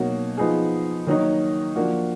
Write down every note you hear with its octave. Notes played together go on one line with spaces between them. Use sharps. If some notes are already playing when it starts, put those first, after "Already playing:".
Already playing: B2 F#3 A#3 D#4 F#4
F3 B3 D#4 G#4
D#3 F#3 A#3 D#4
F3 A#3 D4 F#4